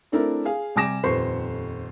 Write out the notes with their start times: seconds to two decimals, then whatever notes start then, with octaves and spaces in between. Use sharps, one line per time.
0.12 A3 C4 D4 E4 A4 A#4
0.45 G#4 F5
0.76 C3 G3 G#5 D6 A#6 E7
1.03 D#1 F2 B4 C5 C#6 C7